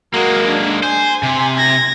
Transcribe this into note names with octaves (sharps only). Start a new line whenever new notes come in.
G#3 A#3 F#4 A#4
D4
C5 G#5
C3
G#6 A#6